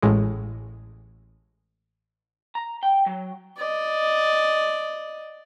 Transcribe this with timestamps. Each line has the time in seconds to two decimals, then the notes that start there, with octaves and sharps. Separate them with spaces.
0.02 A1 A2 G#3
2.55 A#5
2.83 G5
3.06 F#3
3.57 D5 D#5